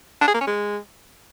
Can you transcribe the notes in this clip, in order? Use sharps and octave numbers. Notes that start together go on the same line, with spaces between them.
D4
G#4
A#3
C#4
G#3